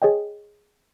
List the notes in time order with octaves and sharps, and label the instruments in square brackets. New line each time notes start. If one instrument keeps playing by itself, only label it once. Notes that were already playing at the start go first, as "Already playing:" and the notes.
[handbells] G#4 C#5 D#5 G5